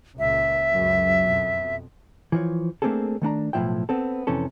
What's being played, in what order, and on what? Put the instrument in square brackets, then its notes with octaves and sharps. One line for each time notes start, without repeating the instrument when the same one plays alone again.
[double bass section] C#2 A#2 [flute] E5
[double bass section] C#2 F#2
F2 B2
[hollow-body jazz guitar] E3 F3 C#5
A3 A#3 C4 D4 G#4 A4
D#3 A3 D4 A#5
B1 A2 D#3 F3 E4 G5
B3 C4 A4
F2 C3 E3 C#4 A4